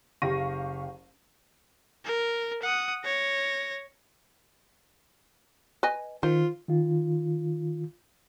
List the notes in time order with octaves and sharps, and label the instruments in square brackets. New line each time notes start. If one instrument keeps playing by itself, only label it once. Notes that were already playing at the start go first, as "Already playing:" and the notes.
[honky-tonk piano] F#1 G4 F5 C#6 A#6 D#7
[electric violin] A#4
F#5 D#6
C#5 A#6
[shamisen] B4 D#5 G#5
[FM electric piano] D#3 [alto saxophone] F4 [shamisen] C5
[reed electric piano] D#3 F4